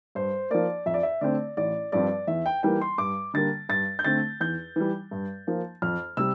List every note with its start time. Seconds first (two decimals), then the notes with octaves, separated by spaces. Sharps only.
0.15 G2 C5
0.50 F3 A#3 D5
0.86 F2 E5
0.94 D5
1.03 E5
1.21 D3 A3 C4 D5
1.57 A1 D5
1.92 G2 F3 C4 D5
2.27 E2 E5
2.46 G5
2.63 E3 G3 A#3 G5
2.81 C6
2.98 G2 D6
3.34 D3 G3 A#3 A6
3.69 G2 A6
3.99 G6
4.04 D3 A3 C4 A6
4.41 E2 G6
4.76 E3 G3
5.11 G2
5.47 F3 A#3
5.82 F2 F6
6.17 C3 G3 E6